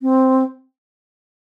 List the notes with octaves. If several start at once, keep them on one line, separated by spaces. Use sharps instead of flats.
C4